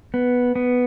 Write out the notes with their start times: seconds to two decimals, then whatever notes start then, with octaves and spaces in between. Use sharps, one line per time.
0.14 B3
0.55 B3